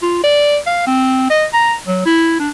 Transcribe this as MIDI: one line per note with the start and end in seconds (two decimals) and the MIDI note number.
0.02 0.23 65
0.24 0.58 74
0.67 0.83 77
0.87 1.28 60
1.30 1.46 75
1.54 1.75 82
1.87 2.00 54
2.06 2.36 64
2.39 2.50 62